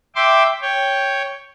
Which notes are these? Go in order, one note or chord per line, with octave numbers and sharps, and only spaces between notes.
E5 G5 C6 D6
C#5 G5